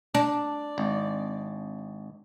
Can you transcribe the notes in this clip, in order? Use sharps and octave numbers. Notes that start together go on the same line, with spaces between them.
D4 D5
G#1